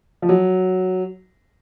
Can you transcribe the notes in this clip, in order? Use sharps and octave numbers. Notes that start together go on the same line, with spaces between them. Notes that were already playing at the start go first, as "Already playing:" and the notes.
F3
F#3